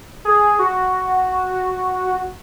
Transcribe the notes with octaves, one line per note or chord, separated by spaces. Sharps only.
G#4
F#4